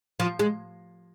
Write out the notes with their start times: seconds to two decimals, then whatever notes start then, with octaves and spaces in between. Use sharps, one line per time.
0.20 F3
0.39 G#3